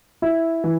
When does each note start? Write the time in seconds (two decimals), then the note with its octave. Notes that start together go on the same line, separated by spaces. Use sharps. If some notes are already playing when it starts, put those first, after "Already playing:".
0.22 E4
0.64 E3